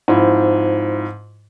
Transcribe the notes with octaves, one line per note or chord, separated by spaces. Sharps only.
G#2 F3 C4 E4